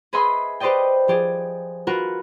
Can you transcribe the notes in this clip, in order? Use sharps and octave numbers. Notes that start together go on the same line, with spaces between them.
G#4 B4 D#5 E5 B5 C6
G4 B4 C5 D5 D#5 G5
F3 G4 G#4
F4 F#4 A#4 B4 F#5